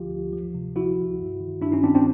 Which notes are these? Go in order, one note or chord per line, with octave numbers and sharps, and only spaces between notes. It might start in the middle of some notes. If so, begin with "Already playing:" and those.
Already playing: D2 D3 F3 F4 G4
D2
F3
C3
F3 E4 F#4
C#2
G2
D#3
G2 D4 E4
C#4 D#4
D#3 C4 D4
C4 D4